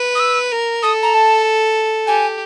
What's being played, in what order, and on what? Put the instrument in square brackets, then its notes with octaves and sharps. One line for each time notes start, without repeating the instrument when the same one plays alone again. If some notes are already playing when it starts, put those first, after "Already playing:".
Already playing: [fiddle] B4
[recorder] D#6
E6
[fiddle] A#4
[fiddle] A4 [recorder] D#6
[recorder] A#5
A5
[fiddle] G4 [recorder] G#5